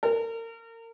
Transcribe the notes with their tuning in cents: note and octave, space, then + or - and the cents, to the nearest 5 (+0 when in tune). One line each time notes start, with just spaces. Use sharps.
A#4 -35